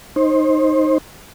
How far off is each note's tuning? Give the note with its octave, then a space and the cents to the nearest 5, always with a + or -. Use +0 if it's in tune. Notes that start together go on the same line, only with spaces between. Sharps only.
D#4 +0 C5 +25